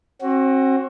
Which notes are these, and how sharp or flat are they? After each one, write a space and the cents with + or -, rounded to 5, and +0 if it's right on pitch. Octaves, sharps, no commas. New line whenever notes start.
C4 +40 F#4 +10